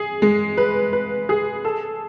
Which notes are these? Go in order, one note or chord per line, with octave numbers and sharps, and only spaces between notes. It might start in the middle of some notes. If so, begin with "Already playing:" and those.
Already playing: G#4
G#3
B4
B4
G#4
A4